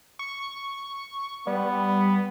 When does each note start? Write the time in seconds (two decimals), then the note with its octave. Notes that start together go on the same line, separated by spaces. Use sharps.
0.19 C#6
1.47 G3 B3